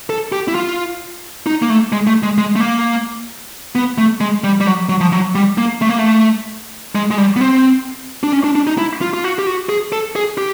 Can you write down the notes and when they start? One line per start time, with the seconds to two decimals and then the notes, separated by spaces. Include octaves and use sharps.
0.10 A4
0.32 G4
0.48 E4
0.55 F4
1.46 D#4
1.62 A#3
1.70 A3
1.92 G#3
2.07 A3
2.23 G#3
2.38 G#3
2.56 A3
2.60 A#3
3.75 B3
3.98 A3
4.21 G#3
4.44 G3
4.61 G3
4.66 F#3
4.89 F#3
5.01 F3
5.12 F#3
5.35 G3
5.58 A#3
5.81 A3
5.89 A#3
5.99 A3
6.95 G#3
7.11 G#3
7.18 G3
7.36 B3
7.41 C4
8.23 D4
8.33 C#4
8.44 D4
8.55 D4
8.67 D#4
8.78 E4
9.01 F4
9.14 F4
9.24 F#4
9.39 G4
9.47 F#4
9.69 G#4
9.92 A4
10.16 G#4
10.38 G4